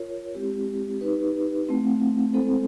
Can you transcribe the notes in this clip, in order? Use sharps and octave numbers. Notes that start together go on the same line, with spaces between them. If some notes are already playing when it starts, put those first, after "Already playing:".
Already playing: F4 A#4 C#5
G#3 C4 E4 G4
D#4 G4 B4
A3 C4 E4
G#3 C4 E4 A4 C5